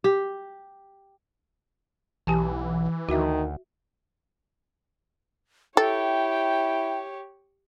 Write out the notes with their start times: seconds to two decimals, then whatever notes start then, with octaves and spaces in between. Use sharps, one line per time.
0.04 G4
2.27 B1 E3 G4 G#5 A5
3.09 D2 D#3 F#4 E5
5.77 E4 G4 A4 C#5 G5